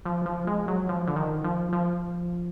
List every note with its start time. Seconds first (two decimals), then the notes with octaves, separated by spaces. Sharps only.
0.05 F3
0.26 F3
0.47 G#3
0.68 F#3
0.89 F3
1.07 D3
1.16 D#3
1.44 F3
1.73 F3